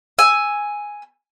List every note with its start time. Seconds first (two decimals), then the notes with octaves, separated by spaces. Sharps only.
0.19 G#5 E6